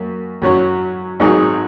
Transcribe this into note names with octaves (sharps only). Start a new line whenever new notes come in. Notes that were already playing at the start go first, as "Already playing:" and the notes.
Already playing: F#2 A#3
F#2 F#3 C#4 F#4 C#5
G#1 G#2 F#3 D#4 G#4